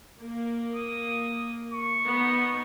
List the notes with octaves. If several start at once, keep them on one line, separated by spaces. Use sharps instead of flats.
A#3
D#6
C#6
B3 D#4